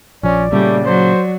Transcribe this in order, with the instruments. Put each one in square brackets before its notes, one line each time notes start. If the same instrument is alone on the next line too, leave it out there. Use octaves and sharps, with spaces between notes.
[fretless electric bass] A#1 F3 [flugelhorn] C#4 [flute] D5
[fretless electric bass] A#2 C#3 [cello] G3 [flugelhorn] A3
[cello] F#3 [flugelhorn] C5